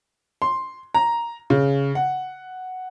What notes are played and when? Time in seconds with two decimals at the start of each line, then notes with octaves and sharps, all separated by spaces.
0.42 C6
0.95 A#5
1.50 C#3
1.95 F#5